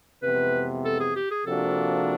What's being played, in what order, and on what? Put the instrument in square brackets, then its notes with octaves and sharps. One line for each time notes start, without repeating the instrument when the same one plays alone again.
[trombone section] F2 C3 E3 G#3 B3 [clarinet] B4
[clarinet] A4
G#4
G4
G#4
[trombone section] C3 F3 A#3 D4 F#4 [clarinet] A4